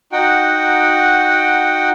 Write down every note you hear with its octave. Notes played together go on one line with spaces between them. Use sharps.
D#4 F#4 F#5 G5